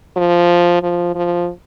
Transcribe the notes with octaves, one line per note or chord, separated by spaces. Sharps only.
F3
F3
F3